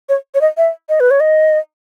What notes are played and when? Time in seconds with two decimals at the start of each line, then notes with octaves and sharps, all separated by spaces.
0.09 C#5
0.35 C#5
0.41 D#5
0.57 E5
0.89 D#5
1.00 B4
1.11 C#5
1.20 D#5